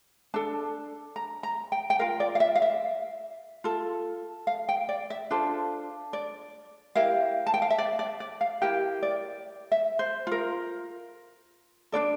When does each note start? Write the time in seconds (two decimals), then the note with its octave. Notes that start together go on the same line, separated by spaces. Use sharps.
0.34 D4 A4 A5
1.16 A#5
1.43 A#5
1.72 G5
1.90 G5
1.99 F4 A#4 F5
2.20 D5
2.35 F5
2.40 E5
2.55 F5
2.62 E5
3.64 F4 A4
4.47 F5
4.69 G5
4.89 D5
5.10 E5
5.30 D4 F4 A4 C5
6.13 D5
6.95 E4 G4 A#4 F5
7.47 A5
7.54 G5
7.62 F5
7.70 E5
7.78 D5
7.99 D5
8.20 D5
8.41 F5
8.62 E4 G4 A#4 G5
9.03 D5
9.72 E5
9.99 C5
10.27 F4 A#4
11.92 D4 F4 A4 D5